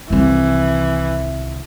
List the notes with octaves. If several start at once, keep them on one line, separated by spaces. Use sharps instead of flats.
C2 D#3 E3